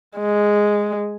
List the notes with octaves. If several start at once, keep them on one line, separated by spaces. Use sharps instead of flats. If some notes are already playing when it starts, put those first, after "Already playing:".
G#3